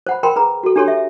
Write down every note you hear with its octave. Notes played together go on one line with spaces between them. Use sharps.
C5 F#5 B5
A#4 G5 B5 C6
G#4 B4 A#5
F#4 A4
D4 G4 A4 C#5 C6
E5